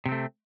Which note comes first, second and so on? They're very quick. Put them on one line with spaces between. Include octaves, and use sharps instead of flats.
C3 C4 A3